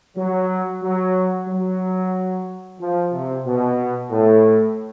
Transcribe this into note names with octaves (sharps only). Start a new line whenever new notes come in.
F#3
F#3
F#3
F3
C3
B2
A2